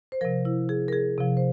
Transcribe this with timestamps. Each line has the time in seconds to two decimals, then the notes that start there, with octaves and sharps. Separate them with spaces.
0.12 C5
0.21 C3 F3 A#4
0.45 E4
0.69 G#4
0.88 A#4
0.92 G#4
1.18 C3 F3
1.37 C5